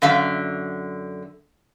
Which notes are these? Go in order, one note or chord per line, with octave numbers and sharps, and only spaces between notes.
F#2 D3 E5 F5